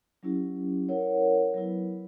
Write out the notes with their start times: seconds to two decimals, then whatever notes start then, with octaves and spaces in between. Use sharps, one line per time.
0.23 F#3 C#4 E4 G4
0.89 E4 A#4 C#5 F#5
1.54 F#3 B3 E4 B4